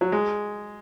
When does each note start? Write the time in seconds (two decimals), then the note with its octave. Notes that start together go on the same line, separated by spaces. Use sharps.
0.01 F#3
0.12 G#3